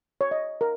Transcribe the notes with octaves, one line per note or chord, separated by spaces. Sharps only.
C#5
D#5
A#4